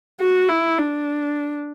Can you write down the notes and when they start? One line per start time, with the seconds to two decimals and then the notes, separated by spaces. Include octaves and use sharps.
0.20 F#4
0.49 E4
0.78 D4